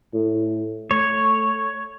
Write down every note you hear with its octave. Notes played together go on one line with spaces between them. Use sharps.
A2
A3 C#5